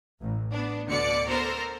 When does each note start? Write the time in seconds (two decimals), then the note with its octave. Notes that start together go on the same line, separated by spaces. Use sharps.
0.20 A1
0.51 B3 D4
0.87 D2 B2 D3 D5 C#7
1.29 B3 A4 A#4 C5